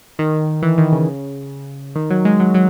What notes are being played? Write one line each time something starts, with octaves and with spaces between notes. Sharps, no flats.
D#3
E3
D#3
C#3
D#3
F#3
G#3
F#3
F#3